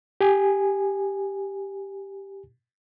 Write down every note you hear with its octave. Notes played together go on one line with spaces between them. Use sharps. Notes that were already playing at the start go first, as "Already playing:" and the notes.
G4 G#5